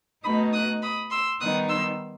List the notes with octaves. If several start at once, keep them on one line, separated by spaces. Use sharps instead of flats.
B2 A3 D#4 B5 D#6
D#6 F#6
B5 D#6
C6 E6
D#3 G3 B3 D#4 D#6 F#6
C6 E6